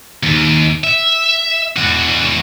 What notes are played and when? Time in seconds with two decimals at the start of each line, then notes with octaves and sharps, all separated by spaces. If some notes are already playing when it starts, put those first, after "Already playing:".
0.23 D#2
0.84 E5
1.77 E2 F#4